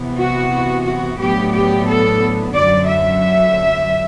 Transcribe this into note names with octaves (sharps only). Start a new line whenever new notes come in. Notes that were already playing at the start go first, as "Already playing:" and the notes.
Already playing: C3 E3 B3
F#4
F#4
A2 F#3 B3 D4 G4
G4
A4
F#2 D3 F#3 D5
E5